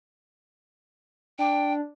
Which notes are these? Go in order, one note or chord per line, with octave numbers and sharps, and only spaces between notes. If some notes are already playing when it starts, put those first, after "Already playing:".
D4 G5